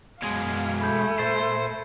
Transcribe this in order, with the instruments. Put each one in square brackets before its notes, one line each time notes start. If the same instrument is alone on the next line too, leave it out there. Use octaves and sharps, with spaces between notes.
[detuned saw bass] F#2 [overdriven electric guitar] B2 G#3 [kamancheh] F5 [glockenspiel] G#6
[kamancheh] A3 [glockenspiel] B5 G6 G#6
[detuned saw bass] A#2 [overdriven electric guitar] C5 [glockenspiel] A6